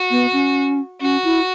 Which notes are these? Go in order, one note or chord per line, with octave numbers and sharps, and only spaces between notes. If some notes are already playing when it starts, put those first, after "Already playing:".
Already playing: F#4
B3
C#4
C#4 F#4
E4